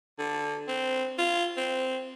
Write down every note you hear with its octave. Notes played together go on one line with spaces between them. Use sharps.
D3
C4
F4
C4